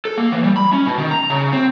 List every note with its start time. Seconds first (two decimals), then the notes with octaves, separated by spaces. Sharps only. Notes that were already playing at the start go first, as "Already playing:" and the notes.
0.05 A4
0.18 A#3
0.32 E3
0.44 G3
0.57 B5
0.73 C#4
0.87 B2
0.98 D#3
1.11 A#5
1.30 C#3
1.53 C4